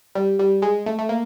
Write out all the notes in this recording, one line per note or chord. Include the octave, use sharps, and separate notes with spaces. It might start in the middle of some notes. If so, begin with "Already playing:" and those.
G3
G3
G#3
A3
A3
A#3